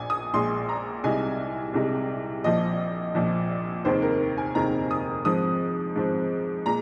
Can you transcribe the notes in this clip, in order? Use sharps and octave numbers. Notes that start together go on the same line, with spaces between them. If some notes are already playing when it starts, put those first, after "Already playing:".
Already playing: A#1 A#2 G#5
D#6
A#1 A#2 G#3 C6
A#5
C2 C3 G#3 D#4 G#5
C2 C3 G#3 D#4
A#1 A#2 F3 D#5
A#1 A#2 F3
F1 D#2 D#3 G#3 C4 C5
A#4
G#5
F1 D#2 D#3 G#3 C4 A#5
D#6
G#2 F3 C4 D#6
G#2 F3 C4
A#2 G#3 A#5